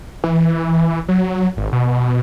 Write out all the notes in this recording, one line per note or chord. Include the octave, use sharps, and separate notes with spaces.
E3
F#3
G#1
B2